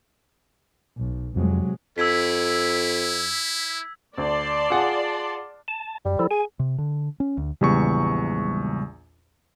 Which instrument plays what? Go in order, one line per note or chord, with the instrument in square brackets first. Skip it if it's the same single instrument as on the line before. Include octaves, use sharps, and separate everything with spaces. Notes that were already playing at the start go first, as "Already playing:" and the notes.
[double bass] B1
[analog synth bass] F2 [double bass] C3 G#3 [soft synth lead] F#3
[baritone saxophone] F2 [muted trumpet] E4 [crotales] E6 G#6 B6
[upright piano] D2 [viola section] D5 A5 C6
[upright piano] F4 G#4 F#5
[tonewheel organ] A5
[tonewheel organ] F#2 [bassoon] G3
[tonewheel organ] F3 E4 A4
[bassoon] G#4 [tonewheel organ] G#5
[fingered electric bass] C3
D3
C#4
D2
[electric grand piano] A#1 E2 C#6 [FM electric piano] C#3 G3 G#3